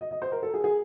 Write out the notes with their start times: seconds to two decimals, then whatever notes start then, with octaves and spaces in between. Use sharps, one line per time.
0.01 D#5
0.11 D#5
0.22 C5
0.32 A#4
0.43 A4
0.54 G#4
0.64 G#4